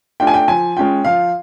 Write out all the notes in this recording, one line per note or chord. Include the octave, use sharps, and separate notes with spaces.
A3 D4 F4 G5
G#5
G5
F3 G#5
G#3 C#4 F4 G5
F3 F5